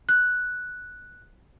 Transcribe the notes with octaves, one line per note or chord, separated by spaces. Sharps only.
F#6